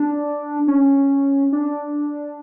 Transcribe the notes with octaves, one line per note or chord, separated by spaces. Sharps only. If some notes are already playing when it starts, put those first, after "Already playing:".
Already playing: D4
C#4
D4